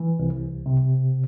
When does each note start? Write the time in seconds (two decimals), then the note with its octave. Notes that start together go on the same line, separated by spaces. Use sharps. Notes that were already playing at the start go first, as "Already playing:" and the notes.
Already playing: E3
0.19 C2
0.66 C3